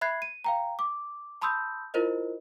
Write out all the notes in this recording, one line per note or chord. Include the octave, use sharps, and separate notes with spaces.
E5 B5 F#6 G#6 C7
D#7
F5 G5 A#5
D6
A5 B5 C6 D#6 E6 G6
E4 F4 A#4 C5 D#5